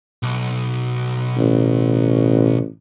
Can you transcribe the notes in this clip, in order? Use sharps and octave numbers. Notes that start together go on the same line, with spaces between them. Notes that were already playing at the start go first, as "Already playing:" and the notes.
B1
A1